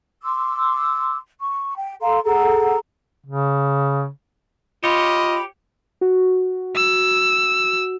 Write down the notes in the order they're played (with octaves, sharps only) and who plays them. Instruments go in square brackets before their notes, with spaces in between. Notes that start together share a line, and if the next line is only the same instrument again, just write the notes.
[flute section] C6 D6 E6
C#6
G5
A4 F5 A#5 C6
G#4 A4 F#5 A#5
[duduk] C#3
[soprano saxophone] F4 [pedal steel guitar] G4 C#5 [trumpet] D#5 [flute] B5
[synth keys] F#4
[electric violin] E6